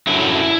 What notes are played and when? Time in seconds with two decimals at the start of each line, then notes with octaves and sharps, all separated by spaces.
0.07 F#2 D3 F#3 E4